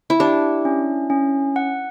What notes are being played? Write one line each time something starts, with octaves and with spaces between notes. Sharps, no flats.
E4
D4 G4
C#4
C#4
F#5